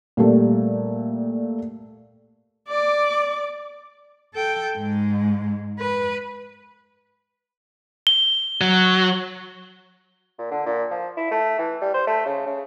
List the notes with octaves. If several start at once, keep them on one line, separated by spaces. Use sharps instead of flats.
A#2 G3 A3
D5 D6
A4 G5
G#2 G#3
B4
G7
F#3
A#2
D3
A#2
F3
E4
A3
E3
G3
C5
A3
C#3
C#3